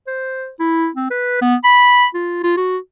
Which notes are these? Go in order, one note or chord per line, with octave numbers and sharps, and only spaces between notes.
C5
E4
C4
B4
B3
B5
F4
F4
F#4